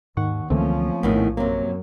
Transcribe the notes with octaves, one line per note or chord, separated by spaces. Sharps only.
D#2 G#2 D#3 F#5 C#6
C#2 D3 E3 F3 A3 A#3 C4 C#4
A#1 E2 A2 D#3
F#2 C3 F#3 A#3 C4